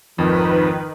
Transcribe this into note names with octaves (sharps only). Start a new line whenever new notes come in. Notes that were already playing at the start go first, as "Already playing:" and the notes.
G#1 F2 D#3 F3 B4